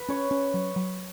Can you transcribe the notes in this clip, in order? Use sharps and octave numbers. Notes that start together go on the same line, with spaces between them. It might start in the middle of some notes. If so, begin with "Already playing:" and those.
Already playing: B4
C#4 C#5
C#4
F#3
F#3